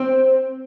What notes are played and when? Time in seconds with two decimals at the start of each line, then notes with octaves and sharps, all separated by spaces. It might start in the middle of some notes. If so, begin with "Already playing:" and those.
Already playing: C4